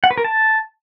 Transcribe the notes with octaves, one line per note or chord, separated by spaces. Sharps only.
F#5
B4
A#4
A5